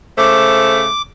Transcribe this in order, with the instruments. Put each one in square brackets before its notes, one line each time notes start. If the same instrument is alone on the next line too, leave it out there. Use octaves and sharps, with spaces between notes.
[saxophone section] C#3 A3 C5 [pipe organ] D6